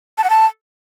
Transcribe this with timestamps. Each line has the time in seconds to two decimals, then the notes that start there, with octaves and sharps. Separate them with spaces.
0.18 A5
0.24 F#5
0.30 A5